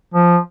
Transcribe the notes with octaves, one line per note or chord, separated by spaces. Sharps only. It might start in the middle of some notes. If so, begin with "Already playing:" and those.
F3